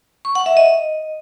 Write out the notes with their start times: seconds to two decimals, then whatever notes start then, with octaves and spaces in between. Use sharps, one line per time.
0.25 C#6
0.35 F#5
0.46 E5
0.57 D#5